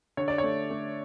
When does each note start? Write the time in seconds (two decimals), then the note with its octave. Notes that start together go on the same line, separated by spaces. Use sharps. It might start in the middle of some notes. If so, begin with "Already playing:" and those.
0.17 D3 C#5
0.28 D5
0.38 C#5
0.43 A3
0.70 A3